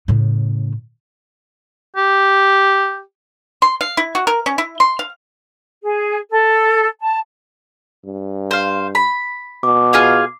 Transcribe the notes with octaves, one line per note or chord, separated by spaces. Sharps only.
A2 C#3
G4
C6
F5
E4
F#4
A#4
C#4
E4
C6
F5
G#4
A4
A5
G2
C5 F5
B5
B2 D6
F4 G#4 F5